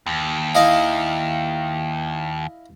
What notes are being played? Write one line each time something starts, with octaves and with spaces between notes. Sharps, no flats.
D#2
E4 D#5 F5